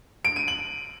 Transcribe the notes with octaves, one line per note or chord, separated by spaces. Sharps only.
D7
D#7
F#7